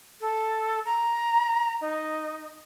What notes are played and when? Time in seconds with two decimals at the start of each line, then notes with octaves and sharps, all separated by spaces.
0.21 A4
0.86 A#5
1.81 D#4